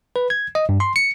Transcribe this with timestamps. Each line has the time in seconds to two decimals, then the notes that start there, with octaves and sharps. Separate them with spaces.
0.16 B4
0.30 G#6
0.55 D#5
0.69 G2
0.80 C6
0.96 C#7